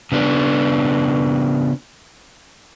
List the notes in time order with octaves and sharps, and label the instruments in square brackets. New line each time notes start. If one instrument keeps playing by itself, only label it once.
[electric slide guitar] C#3 B3 D4